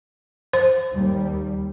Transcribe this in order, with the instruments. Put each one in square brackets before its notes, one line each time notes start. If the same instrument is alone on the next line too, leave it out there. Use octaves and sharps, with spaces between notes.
[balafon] C5
[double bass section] D#2 G3